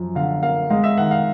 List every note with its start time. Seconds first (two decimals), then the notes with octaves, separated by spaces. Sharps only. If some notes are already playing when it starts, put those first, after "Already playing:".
Already playing: F#2 F3
0.15 D3 F5
0.43 A#3 F5
0.70 G#3 F5
0.84 E5
0.97 D#3 F#5
1.11 F5